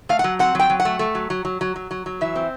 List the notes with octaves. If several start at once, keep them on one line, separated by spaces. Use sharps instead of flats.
A3 F5
F#5
F#3
C4 F#5
F#3 G5
F#3
F#5
A3
A3
F#3
F#3
F#3
F#3
F#3
F#3
F#3
E3 E5
C4